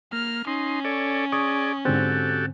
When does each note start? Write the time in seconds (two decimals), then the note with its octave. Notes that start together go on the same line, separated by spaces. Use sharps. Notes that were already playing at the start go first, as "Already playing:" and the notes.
0.12 A#3 F6
0.47 C#4 D#4 C6
0.84 A4 C#5 D5
1.32 G#4 D5 C#6 D#6
1.85 G#2 D3 C4 F#4 G4 A4